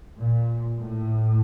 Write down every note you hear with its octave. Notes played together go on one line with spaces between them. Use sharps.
A#2
A2